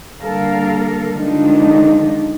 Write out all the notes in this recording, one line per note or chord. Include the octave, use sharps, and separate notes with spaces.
D3 G3 A#3 A4 A#4 F5
D3 D#3 F3 G#3 D4 D#4